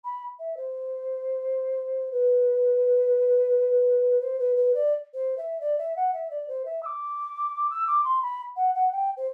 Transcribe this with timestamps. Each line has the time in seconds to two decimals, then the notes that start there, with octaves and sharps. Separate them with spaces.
0.04 B5
0.39 E5
0.56 C5
2.12 B4
4.21 C5
4.39 B4
4.56 B4
4.74 D5
5.14 C5
5.37 E5
5.60 D5
5.78 E5
5.96 F#5
6.13 E5
6.30 D5
6.48 C5
6.65 E5
6.82 E6
6.86 D6
7.70 E6
7.87 D6
8.04 C6
8.22 B5
8.56 F#5
8.74 F#5
8.91 G5
9.17 C5